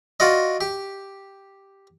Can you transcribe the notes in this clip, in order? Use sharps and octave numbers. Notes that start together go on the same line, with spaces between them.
F4 F#4 D5 D#5
G4